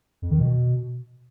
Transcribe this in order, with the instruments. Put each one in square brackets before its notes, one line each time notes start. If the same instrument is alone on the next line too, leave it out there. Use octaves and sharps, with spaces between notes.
[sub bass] F2
D#3
B2